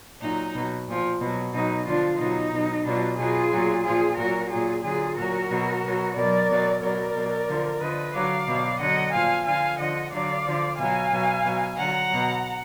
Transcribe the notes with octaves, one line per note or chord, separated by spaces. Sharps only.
A#2 F#3 D#4
B2 F#3
A#2 F3
B2 F#3
B2 F#3 D#4
D3 F3 D4 F4
B2 F#3 D#4
B2 F#3
B2 F#3 D4 F4
B2 F#3 F4 G#4
A#2 F#3
A#2 F3 F4 G#4
A#2 F#3 F#4 A#4
A#2 F#3 F4 G#4
D3 F#3 F4 G#4
A#2 F#3 F#4 A#4
B2 F#3
B2 F#3
B2 F#3 A#4 D5
B2 F#3
B2 F#3 A#4 D5
B2 F#3
D3 F3
D3 F3 B4 D#5
D3 F#3 D5 F5
B2 F#3
D3 F#3 D#5 F#5
A#2 F3 F5 G#5
D3 F3 F5 G#5
D3 F3 D#5 F#5
D3 F#3 D5 F5
D3 F3
B2 F#3 F5 G#5
B2 F#3
B2 F#3
D3 F#3 F#5 A#5
B2 F#3